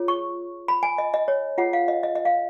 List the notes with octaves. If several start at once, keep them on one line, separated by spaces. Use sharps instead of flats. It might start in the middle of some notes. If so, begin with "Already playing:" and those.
Already playing: F4 G#4 C#5
C#6
B5
G#5
D#5
D#5
C#5
F4 G#4 C#5 F#5
F5
D#5
D#5
D#5
F5